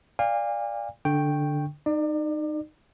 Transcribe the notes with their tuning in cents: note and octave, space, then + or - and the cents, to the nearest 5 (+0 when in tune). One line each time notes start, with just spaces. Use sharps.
D5 +0 F5 +0 G#5 -40
D3 +0 G5 +0 C#6 -15
D#4 -20 D5 +30